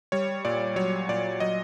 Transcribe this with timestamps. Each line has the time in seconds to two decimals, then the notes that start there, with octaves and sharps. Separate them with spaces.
0.12 G3 C#5
0.45 A#2 D5
0.76 F#3 C#5
1.09 A#2 D5
1.40 F#3 D#5